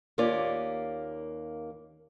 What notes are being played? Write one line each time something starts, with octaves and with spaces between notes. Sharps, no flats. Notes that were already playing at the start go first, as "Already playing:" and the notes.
D#2 A#3 C#4 F4 D5